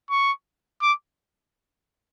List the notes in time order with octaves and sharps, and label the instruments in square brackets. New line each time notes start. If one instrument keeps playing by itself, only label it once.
[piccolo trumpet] C#6
D6